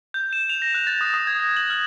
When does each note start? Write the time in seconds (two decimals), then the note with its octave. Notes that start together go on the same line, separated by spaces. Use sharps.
0.14 G6
0.33 E7
0.49 F7
0.62 A#6
0.75 F#6
0.87 A6
1.01 D#6
1.14 D#6
1.27 G#6
1.40 A#6
1.56 F#7
1.70 F6